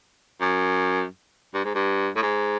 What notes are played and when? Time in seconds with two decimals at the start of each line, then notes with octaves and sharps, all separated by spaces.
0.41 F#2
1.54 G2
1.64 G#2
1.75 G2
2.16 A2
2.23 G#2